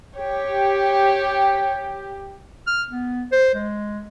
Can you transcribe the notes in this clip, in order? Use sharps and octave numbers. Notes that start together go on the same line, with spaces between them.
G4 C#5
F6
B3
C5
G#3